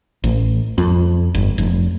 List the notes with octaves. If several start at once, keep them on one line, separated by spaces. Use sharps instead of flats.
A1
F2
G1
F1